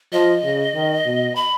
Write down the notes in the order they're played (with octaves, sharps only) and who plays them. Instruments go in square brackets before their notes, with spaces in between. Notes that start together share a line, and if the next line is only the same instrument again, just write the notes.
[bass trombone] F3 [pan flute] D#5
[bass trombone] C#3
D#3
B2
[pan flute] B5